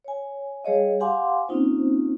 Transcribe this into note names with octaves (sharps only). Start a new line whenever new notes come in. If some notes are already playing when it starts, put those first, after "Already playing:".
C#5 G#5
G3 G#4 C#5 D#5 F5
G4 F5 F#5 G#5 C6 D6
A#3 C4 C#4 D#4 F4 C5